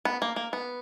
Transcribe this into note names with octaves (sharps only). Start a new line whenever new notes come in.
B3
A#3
A#3
B3